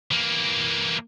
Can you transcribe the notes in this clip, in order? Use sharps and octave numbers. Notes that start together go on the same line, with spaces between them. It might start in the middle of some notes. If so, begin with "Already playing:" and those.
E3 A#3